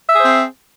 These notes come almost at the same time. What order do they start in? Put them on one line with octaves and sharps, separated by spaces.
E5 G#4 C5 C4